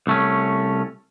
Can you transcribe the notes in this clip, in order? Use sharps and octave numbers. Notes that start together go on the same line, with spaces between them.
C2 A3 C#4